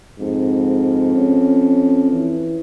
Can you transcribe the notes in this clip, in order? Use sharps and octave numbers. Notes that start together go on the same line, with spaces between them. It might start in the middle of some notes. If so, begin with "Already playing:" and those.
F2 G#2
C#4
E3